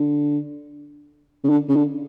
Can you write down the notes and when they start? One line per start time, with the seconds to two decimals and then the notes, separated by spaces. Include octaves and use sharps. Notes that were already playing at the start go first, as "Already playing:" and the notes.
Already playing: D3
1.44 C#3
1.49 D3
1.69 C#3
1.76 D3